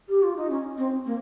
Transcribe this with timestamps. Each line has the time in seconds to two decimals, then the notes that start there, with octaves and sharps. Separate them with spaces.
0.09 G4
0.23 F4
0.36 D#4
0.50 C#4
0.78 C4
1.06 A#3